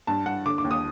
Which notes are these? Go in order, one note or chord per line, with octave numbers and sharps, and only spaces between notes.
G2 A5
G2 F#5
D3 D6
D6
D#2
D#6